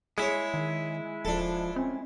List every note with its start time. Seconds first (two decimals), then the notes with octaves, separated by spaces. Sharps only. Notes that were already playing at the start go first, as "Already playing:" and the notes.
0.18 G#3 E4 G#4 C#5
0.54 D#3
1.25 D#1 F3 D4 A4
1.76 C4 C#4